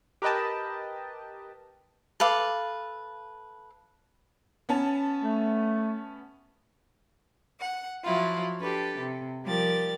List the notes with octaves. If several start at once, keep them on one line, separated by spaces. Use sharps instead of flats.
G4 A#4 B4 D#5 G5 A5
A4 B4 F5 D6
B3 C#4 A5
A3
F#5
F3 F#3 E4 F4
D4 G4 A4 B4
C3
F3 G3 G4 A#4 D5 A6